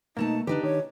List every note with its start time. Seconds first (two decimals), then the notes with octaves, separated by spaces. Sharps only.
0.17 B2 A3 A#3 D#4 A5
0.47 D3 D4 D#4 G4 B4
0.63 D#3 C#5